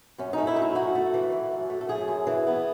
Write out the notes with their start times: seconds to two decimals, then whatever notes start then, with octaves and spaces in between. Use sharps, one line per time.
0.18 F#2 C#4
0.33 A3 D#4
0.47 E4
0.56 F#2
0.62 D#4
0.75 F#2 F#4
0.95 A3
1.14 E3
1.32 E3
1.52 F#2
1.70 A3
1.81 A4
1.89 F#2 G#4
2.08 F#2
2.27 E3
2.47 B3